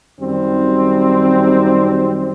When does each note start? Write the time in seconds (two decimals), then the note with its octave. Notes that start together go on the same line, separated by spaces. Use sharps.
0.21 F#2 D#3 G3 C4